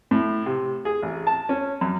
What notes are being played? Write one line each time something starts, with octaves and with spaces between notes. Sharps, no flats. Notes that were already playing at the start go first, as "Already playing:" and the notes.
A2
C3
G#4
A1
A5
C#4
F#2